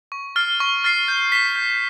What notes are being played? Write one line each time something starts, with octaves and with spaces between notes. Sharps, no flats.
C#6
F6 A6 C7
C#6
F6 A6 C7
G6
B6 E7
G6